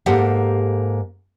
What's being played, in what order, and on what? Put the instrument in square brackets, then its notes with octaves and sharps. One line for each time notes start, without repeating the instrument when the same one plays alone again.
[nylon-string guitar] G#2 A#3 G4 A4 F#5